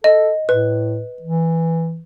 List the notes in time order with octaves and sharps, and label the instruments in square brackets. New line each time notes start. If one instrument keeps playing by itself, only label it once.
[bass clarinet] A4 [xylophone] D#5
[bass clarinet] A2 [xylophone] B4
[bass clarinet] E3